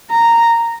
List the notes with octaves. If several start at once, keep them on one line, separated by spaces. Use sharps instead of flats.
A#5